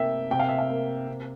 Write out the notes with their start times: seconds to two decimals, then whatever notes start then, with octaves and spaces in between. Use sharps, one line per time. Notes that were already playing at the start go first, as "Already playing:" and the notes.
Already playing: C3 A#3 E5 G5
0.31 C3 G5
0.39 F5
0.49 E5
0.59 F5
0.70 A#3
1.07 C3